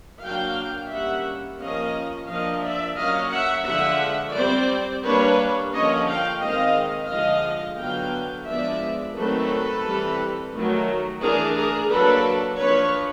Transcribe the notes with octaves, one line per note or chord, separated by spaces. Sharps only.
F#3 A#3 D4 F5 G5
G3 A#3 C#4 E5 F#5
F3 A#3 C#4 D#5 F5
F3 A#3 D4 D#5 F5
D5 E5
F#3 A#3 C#4 D#5 F5
E5 F#5
D3 F3 G#3 E5 F#5
G3 C4 C5 D5
G3 A#3 D4 B4 C#5
D3 F3 A#3 C#4 C#5 D#5
F5 G5
D#3 G#3 C4 D#5 F5
D3 F3 G#3 D#5 F5
D3 F#3 B3 F5 G5
F3 G#3 B3 D4 D5 E5
D#3 F#3 A3 C4 A4 B4
E3 G3 C4
D#3 F#3 A3
E3 A3 D4 G#4 A#4
G#4 A#4
F#3 A#3 D4 A4 B4
F3 A#3 D4 B4 C#5